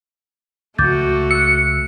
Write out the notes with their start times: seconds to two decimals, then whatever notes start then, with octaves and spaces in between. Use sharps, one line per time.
0.78 C#2 F3 A3 F#4 D6 G6 A6
1.31 E6 F#6 C#7